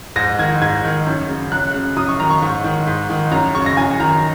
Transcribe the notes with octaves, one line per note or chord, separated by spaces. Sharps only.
G#2 A#6
D#3 G#6
G#2 G#6
D#3
F#2
C#3
F#2 F#6
C#3
F#2 D#6
C#6
D#3 A#5
C#6
G#2
D#3
G#2
D#3
F#2 A#5
C#3 C#6
A#6
F#2 G#5
D#3 A#5